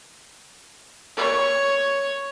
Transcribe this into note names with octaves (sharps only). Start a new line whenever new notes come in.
C#5